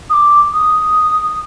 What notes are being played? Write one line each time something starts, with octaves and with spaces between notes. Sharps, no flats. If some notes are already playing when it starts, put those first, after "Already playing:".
D#6
D6
D#6